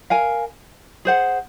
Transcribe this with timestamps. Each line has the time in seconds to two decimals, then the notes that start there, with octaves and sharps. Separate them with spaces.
0.10 A#4 F5 G#5
1.05 G#4 C5 F#5